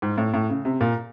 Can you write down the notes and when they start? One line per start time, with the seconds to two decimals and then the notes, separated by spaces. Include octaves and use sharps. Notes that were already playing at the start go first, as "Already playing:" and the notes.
0.02 G#2
0.18 A2
0.34 A2
0.49 C#3
0.65 C3
0.81 A#2